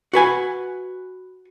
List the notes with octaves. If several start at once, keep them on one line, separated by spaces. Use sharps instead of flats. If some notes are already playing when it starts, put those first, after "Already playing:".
F#4 B4 G#5